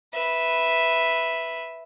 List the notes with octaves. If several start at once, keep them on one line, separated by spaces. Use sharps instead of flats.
B4 E5